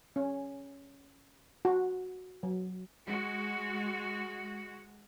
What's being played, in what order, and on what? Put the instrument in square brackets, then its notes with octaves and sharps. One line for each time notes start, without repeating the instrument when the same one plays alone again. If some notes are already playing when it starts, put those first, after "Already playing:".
[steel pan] C#4
F#4
F#3
[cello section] G#3 F#4